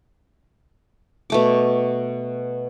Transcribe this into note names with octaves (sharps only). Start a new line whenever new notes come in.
B2 A3 D6